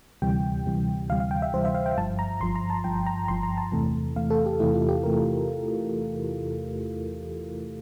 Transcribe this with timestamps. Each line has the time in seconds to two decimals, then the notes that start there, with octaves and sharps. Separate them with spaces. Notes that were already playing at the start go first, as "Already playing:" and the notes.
0.22 D2 C3 E3 G3 G5
0.66 D2 C3 E3 G3
1.10 D2 C3 E3 G3 F5
1.20 F5
1.31 G5
1.42 E5
1.53 D2 C3 E3 G3 C5
1.65 E5
1.75 F5
1.86 G5
1.97 G1 G2 F3 A5
2.19 A#5
2.40 G1 G2 F3 C6
2.56 A#5
2.70 A5
2.84 G1 G2 F3 G5
3.07 A#5
3.28 G1 G2 F3 C6
3.43 A#5
3.58 A5
3.72 E2 C3 E3 A3
4.16 E2 C3 E3 A3 F5
4.30 A4
4.46 G4
4.60 E2 C3 E3 A3 E4
4.74 F4
4.89 G4
5.04 C3 E3 A3 A#4